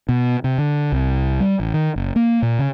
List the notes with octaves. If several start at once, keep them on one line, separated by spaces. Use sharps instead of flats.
B2
C3
D3
C2
G3
A1
D#3
F#1
A#3
A#2
C#3